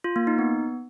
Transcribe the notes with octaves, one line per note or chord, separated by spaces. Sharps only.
F4
A#3
D#4
B3